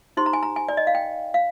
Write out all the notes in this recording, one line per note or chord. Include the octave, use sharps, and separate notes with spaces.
D#4 G4 C5 C6
A#5
G#5
A#5
G#5
D5
D#5
F5
G5
F5